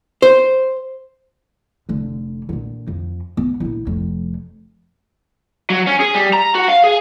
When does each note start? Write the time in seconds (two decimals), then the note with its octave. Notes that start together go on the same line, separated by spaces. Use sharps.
0.22 C5
1.89 F1 D3
2.49 A#2 D3
2.87 F2
3.37 B3
3.60 A#1 E4
3.87 F1 F2
5.70 F#3
5.87 C#4
6.00 G#4
6.15 G3
6.33 A#5
6.55 F#4
6.68 F5
6.84 G#4